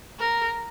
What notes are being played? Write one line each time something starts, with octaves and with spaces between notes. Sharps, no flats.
A#4